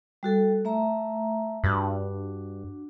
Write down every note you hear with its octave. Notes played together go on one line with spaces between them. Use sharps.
G3 F#4 A4
A3 E5 A#5
G2 D4 F#4